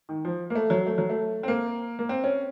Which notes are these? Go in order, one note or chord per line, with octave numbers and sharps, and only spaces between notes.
D#3
F3
A#3
A3
F#3
A3
F#3
A3
C4
A#3
A#3
C4
C#4